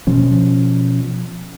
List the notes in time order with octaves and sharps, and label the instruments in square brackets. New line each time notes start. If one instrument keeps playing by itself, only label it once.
[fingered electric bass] B2 F3 C#4